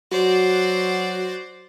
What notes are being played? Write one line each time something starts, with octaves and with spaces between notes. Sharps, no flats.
F#3 F#4 C5 D5